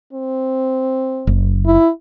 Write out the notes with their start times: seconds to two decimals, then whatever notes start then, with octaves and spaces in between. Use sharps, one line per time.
0.13 C4
1.27 F#1
1.66 E4